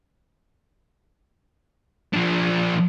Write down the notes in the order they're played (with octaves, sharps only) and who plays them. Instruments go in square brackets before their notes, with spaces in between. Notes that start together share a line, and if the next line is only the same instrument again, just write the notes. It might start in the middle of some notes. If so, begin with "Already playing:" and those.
[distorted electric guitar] F3 D4